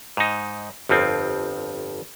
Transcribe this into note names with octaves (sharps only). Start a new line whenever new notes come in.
G#2 D#4
G1 F2 F3 C4